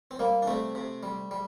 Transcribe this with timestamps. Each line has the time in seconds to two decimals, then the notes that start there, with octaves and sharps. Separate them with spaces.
0.11 C4
0.19 G3 A#3
0.42 D4
0.47 C3 A3 C4
0.75 C3
1.03 G3
1.31 G3